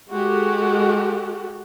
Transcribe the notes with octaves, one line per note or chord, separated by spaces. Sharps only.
G#3 F#4 G4 A4